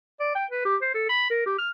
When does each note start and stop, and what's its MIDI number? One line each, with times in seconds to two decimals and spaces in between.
0.20 0.32 74
0.35 0.45 79
0.51 0.64 71
0.65 0.76 67
0.82 0.94 72
0.94 1.09 69
1.09 1.29 83
1.30 1.45 70
1.46 1.57 67
1.58 1.69 89